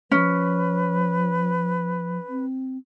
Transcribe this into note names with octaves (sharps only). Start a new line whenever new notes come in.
F3 C#4 B4
C4